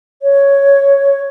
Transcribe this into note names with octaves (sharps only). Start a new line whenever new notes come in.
C#5